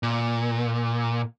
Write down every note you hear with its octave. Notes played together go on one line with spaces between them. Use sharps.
A#2